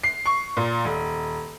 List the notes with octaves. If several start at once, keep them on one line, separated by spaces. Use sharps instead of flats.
C7
C#6
A#2
D#1